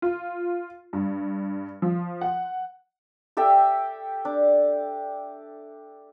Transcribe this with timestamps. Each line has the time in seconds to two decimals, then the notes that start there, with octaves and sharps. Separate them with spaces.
0.02 F4
0.93 G2
1.82 F3
2.21 F#5
3.37 G4 A4 E5 G5
4.25 D4